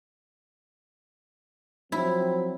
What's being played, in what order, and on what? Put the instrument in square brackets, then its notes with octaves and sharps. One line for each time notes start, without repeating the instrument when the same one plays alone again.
[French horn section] F3 F#3 C4 [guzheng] E4